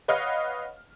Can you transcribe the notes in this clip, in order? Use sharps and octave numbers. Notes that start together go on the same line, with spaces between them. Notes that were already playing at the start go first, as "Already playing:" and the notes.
B4 C#5 D#5 F5 F#5 F6